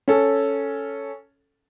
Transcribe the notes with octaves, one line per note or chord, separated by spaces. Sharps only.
C#4 A4